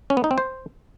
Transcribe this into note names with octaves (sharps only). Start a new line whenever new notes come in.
C#4
B3
D#4
C4
C5